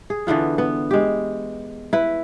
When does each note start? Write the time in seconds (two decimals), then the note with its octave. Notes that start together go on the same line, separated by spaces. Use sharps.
0.10 G#4
0.27 D3 E3 B3 F4
0.58 B3
0.91 G#3 G4
1.93 E4 B4